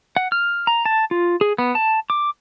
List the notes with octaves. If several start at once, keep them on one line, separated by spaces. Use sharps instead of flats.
F#5
F6
A#5
A5
F4
G#4
B3
A5
D6